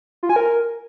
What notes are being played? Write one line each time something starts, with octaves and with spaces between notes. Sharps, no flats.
F4
G#5
A#4